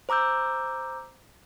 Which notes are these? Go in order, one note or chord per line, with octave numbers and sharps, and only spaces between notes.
C5 A#5 D6 E6 G6